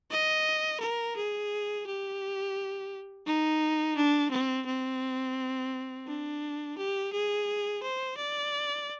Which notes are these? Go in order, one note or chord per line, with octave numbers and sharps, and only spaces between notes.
D#5
A#4
G#4
G4
D#4
D4
C4
C4
D4
G4
G#4
C5
D5